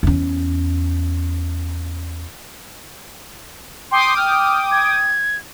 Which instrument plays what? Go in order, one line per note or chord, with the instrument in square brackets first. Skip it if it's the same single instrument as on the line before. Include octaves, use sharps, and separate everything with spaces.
[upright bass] E2 C#4
[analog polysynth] G5 D6 D#6 [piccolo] C6
[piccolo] F6
G#6